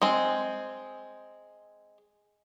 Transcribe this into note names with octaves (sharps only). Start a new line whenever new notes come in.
G#3 C4